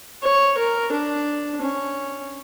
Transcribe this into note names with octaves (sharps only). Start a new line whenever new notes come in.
C#5
A#4
D4
C#4